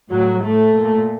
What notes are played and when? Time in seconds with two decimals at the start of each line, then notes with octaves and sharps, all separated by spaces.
0.10 A2 F#3
0.43 A2 A3
0.76 A#2